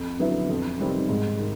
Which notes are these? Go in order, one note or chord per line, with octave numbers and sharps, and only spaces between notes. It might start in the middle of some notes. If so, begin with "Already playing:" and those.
Already playing: F2
D3 F#3 B3 E4
F2
C3 D#3 G3 C4
G#2
D#3